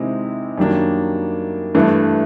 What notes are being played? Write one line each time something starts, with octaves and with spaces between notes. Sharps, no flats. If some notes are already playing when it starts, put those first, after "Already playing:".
Already playing: C3 D#3 G#3 C4 E4
F#2 D#3 G3 A#3 D4
G2 E3 A3 D4